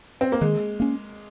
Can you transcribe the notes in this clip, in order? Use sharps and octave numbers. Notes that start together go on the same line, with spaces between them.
C4
A#3
D#3 G#3
A#3 C#4